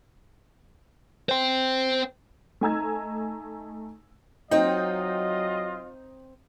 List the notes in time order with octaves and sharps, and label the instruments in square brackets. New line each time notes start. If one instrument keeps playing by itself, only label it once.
[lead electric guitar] C5 G5
[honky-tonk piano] A3 D#4 G#5 A#5 E6 G#6
[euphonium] F#3 [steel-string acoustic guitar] C4 G5 [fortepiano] D#4 [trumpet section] F4 D#5